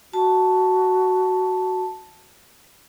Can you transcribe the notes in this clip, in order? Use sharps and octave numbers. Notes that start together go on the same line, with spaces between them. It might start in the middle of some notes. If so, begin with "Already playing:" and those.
F#4 A5